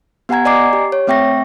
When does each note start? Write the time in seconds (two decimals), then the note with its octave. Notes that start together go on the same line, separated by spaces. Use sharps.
0.29 B3 G4 F#5 G#5 A#5 G#6
0.45 D5 D#5 G#5 A#5 D6 C7
0.73 G4
0.92 C#5
1.07 A3 C4 E5 G5 C#6 A#6